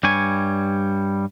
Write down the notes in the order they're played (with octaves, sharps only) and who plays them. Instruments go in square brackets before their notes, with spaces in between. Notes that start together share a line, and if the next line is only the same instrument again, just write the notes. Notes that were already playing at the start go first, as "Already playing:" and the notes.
[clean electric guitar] G2 G3 C#5 G#5